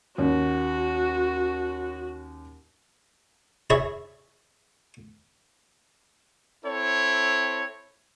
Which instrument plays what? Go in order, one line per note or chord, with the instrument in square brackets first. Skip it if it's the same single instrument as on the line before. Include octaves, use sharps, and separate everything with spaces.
[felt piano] D#2 C#4 [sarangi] F#4
[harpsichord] E4 G#4 C#5 E5
[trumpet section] C4 E4 A4 C#5